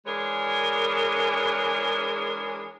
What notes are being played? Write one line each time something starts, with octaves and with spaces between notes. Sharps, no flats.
E3 G#3 D4 G#4 A#4 C#5